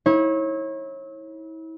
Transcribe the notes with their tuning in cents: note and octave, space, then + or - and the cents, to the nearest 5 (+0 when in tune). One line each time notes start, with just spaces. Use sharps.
E4 -35 C#5 -30